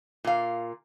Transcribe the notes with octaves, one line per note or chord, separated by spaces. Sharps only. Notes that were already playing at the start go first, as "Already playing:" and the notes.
A#2 F5